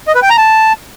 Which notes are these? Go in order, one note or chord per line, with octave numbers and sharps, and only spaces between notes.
D#5
B4
G5
A#5
A5